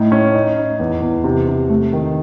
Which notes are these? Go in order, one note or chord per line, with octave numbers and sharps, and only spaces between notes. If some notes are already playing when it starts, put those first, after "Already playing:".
Already playing: A2 D#4
C#4
D#4
D#4
E2
E2
C3
C3
A3
D#3